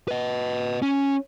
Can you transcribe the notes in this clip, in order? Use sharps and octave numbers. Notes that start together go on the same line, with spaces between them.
B4 D#5
C#4